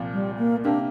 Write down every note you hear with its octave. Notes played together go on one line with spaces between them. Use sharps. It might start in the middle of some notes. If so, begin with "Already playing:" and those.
Already playing: C2 A#2 F3
G3
A#3
C3 A#3 D4 G4